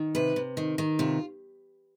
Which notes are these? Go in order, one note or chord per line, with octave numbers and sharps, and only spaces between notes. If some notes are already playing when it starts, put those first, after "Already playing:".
Already playing: D#3
C3 B4
C3
D#3
D#3
C3 F4